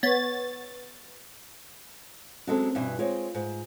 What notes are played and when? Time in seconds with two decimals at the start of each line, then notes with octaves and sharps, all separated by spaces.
0.03 B3 C#5 A6
2.47 F#3 G#3 C4 C#4 A4
2.75 G2 B2 E3
2.99 G#3 C4 F4 C#5
3.35 G#2